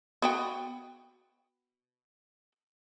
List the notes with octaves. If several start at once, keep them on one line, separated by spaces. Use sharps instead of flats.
B3 F#4 G5